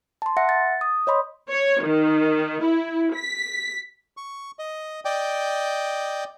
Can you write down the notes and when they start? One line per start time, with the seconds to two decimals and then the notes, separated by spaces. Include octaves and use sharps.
0.22 A5 C6
0.37 E5 F#5 A#6 C#7
0.49 A6
0.81 D#6
1.07 C#5 D#5 B5 C6
1.51 C#5
1.83 D#3
2.63 E4
3.15 B6
4.17 C#6
4.59 D#5
5.05 D5 D#5 G5